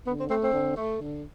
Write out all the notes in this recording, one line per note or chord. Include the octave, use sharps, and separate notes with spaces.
D3 B3
C4
A3 C4
C4
D3
A3
D3